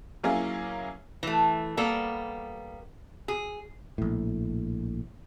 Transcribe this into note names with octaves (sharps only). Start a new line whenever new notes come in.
F#3 A#3 C#4 E4 F4 G#4
E3 A3
G3 A#3 B3 A4
G#4
A#1 A2